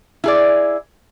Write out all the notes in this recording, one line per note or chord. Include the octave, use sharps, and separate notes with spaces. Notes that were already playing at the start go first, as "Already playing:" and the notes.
E4 G#4 D5